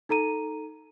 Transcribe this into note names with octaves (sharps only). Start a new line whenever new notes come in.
D#4 A4 A#5 D#7